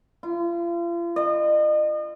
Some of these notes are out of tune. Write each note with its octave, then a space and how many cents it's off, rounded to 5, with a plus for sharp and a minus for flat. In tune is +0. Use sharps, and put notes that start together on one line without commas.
F4 -40
D#5 -40